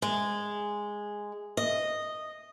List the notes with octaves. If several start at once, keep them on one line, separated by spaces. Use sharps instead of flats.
G#3
D#5